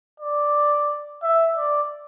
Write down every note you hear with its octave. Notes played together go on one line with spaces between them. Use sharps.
D5
E5
D5